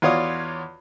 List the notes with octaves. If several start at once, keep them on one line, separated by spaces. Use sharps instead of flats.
E2 F4 F#4 C#5 D5 D#6